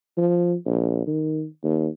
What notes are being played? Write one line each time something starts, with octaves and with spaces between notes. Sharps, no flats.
F3
A#1
D#3
D#2